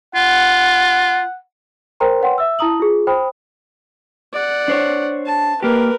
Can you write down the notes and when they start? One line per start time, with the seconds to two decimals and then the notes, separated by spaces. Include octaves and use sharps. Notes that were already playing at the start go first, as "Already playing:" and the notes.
0.15 F4 F#5
2.00 A#4 C5 G5 A#5 C6
2.21 B4 C#5 F#5 G5 C6
2.38 E5 E6
2.59 E4 A5 A#5 D#6 F#7
2.80 F4 G#4
3.07 C5 G5 B5 D#6
4.33 D5 F#5
4.68 D4 C5 C#5
5.26 A5
5.63 A#3 G4 A#4 B4